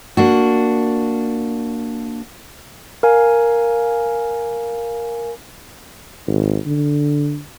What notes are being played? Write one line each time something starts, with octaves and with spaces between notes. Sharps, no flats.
A#3 D4 F#4
A#4 F5 G#5
G#1
D3